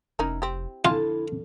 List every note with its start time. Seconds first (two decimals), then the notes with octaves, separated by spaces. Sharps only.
0.19 F1 C#4 D#4 E4 A#4
0.42 C4 G4
0.85 F2 D3 E4 F4 G#5 A5